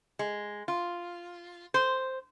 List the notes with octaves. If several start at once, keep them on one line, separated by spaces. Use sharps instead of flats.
G#3
F4
C5